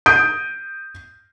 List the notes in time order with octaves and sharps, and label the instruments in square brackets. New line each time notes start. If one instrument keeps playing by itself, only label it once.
[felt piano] D#6 G6 D7